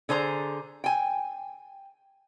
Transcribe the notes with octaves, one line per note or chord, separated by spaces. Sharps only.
D3 G#4 C5 A#5
G5 G#5